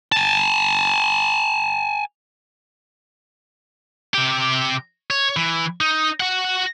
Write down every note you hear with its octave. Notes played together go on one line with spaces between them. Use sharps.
G#5 A5
C3 G4
C#5
E3
D#4
F#4 F#5